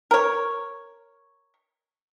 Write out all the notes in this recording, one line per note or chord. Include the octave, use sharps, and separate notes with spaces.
A#4 C#5